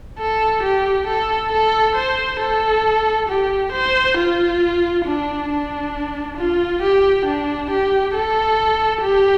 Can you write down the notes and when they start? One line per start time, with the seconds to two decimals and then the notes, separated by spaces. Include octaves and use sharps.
0.19 A4
0.63 G4
1.07 A4
1.53 A4
1.96 C5
2.40 A4
3.29 G4
3.72 C5
4.18 F4
5.05 D4
5.50 D4
6.37 F4
6.82 G4
7.26 D4
7.71 G4
8.15 A4
9.03 G4